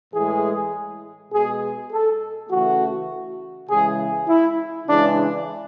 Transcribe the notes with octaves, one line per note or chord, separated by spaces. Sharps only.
A2 E3 G#3 G#4
B2 G#3 G#4
A4
C#3 E3 A3 F#4
C#3 E3 G#3 G#4
E4
C#3 E3 G#3 D4